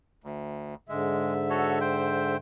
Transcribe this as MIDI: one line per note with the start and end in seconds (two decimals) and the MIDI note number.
0.24 0.75 38
0.89 2.35 44
0.89 2.35 50
0.89 1.34 56
0.89 2.35 76
1.50 1.79 66
1.50 1.79 69
1.50 1.79 73
1.81 2.37 72
1.81 2.37 79